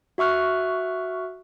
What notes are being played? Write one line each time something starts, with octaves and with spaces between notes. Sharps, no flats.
F#4 E5 C#6 F6 F#6